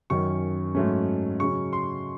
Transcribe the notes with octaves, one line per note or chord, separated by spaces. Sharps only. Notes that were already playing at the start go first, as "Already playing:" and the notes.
F#2 D#3 F#3 C#4 C#6
G#2 F#3 A3 C#4
C#3 F#3 C#4 C#6
C6